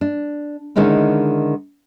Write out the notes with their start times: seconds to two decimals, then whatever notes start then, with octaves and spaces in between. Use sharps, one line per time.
0.01 D4
0.76 D3 D#3 G#3 C#4 D#4 E4